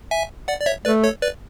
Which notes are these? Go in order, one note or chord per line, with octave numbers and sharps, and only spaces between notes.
E5 G#5
D5 F#5
D5
C#5 E5
A3 B4 D5
A4 C#5
B4 D5